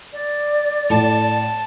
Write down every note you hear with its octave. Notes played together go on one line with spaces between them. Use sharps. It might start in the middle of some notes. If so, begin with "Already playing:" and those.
D5
A2 A5